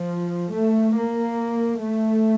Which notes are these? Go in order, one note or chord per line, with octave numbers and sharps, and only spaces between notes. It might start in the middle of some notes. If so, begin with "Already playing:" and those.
Already playing: F3
A3
A#3
A3